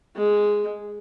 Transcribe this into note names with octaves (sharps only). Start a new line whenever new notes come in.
G#3